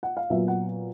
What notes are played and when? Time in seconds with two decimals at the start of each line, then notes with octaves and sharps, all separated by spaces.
0.03 F#5
0.17 F5
0.30 A#2 F#3 B3 E5
0.48 F#5